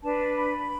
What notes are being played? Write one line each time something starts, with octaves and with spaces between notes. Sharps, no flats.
D4 B4 A5
B5